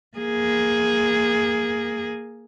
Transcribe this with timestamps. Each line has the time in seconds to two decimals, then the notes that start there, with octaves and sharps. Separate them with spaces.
0.17 A#3 G#4